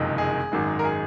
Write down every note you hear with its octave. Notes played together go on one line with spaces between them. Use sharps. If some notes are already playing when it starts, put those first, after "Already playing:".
Already playing: F#1 F2 C3 D#3 G#3
G#4
G#1 F#2 D#3 G#3
A#4
G#4